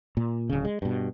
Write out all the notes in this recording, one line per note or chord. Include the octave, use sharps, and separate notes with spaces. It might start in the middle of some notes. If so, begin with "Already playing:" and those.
A#2
D1 C#3
G#3
G2 B2